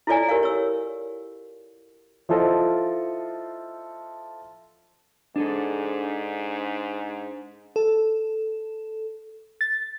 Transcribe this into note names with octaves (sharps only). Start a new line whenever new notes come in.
E4 F4 A4 C#5 D5 G#5
G4 A#4 C#5 F5
C#5 E6
F3 E4 F4 A4 C5 D#5
G#2 D4 G#4 A4
A4
A6